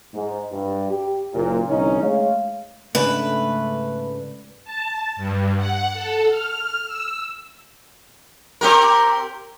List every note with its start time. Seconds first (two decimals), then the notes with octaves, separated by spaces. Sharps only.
0.13 G#2
0.51 G2
0.90 G4
1.33 F#1 A#2
1.69 C2 D3 E3 C#4 D#4
2.02 G#3 A3 C#5 F5
2.95 G#2 C#3 A3 D4 B4
4.64 A5
5.16 G2
5.56 F#5
5.93 A4
6.29 F6
6.86 E6
8.61 C4 G4 A#4